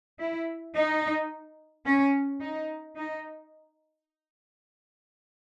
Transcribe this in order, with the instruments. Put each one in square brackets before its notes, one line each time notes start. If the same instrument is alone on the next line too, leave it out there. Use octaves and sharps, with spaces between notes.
[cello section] E4
D#4
C#4
D#4
D#4